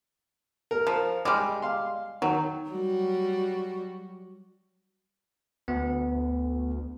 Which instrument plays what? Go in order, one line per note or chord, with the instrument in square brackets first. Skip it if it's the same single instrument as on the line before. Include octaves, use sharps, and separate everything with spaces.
[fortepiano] A#4
[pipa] F3
[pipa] G3 G#3 [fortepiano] D6 F6
[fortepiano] F5 C6
[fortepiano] D#3 [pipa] F#3
[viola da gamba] F#3 G3 F#4
[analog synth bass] D2 [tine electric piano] B3